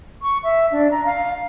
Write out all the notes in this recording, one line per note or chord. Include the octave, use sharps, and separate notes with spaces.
C#6
E5
D4
A#5
F5